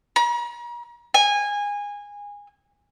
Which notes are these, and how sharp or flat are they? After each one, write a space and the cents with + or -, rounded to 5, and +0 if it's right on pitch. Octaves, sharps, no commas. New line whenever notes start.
A#5 +40
G#5 -20